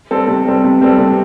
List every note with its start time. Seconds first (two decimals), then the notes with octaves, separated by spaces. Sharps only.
0.11 G3 C4 A4
0.28 C3
0.46 G3 C4 A4
0.64 C3
0.81 G3 C4 A4
0.98 C3